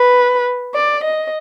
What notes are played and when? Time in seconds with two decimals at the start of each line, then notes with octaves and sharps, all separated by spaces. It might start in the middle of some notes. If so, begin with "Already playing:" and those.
Already playing: B4
0.75 D5
1.04 D#5